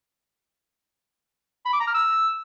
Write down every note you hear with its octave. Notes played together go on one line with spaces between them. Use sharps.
B5
D6
A#5
F6
E6